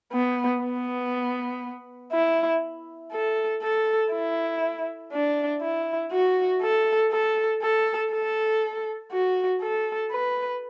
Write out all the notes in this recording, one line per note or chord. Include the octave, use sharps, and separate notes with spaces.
B3
B3
E4
A4
A4
E4
D4
E4
F#4
A4
A4
A4
A4
F#4
A4
B4